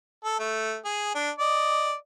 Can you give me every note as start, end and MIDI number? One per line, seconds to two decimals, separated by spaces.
0.25 0.37 69
0.39 0.77 57
0.85 1.10 68
1.15 1.31 62
1.39 1.94 74
1.39 1.94 75